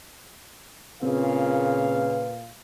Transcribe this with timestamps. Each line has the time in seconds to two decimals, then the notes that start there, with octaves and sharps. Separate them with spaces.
1.03 A#2 C#3 C4 G#4 B4 F5